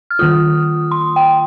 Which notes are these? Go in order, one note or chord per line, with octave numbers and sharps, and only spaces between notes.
F6
D#3 A#3 F4 D#6
C6
G5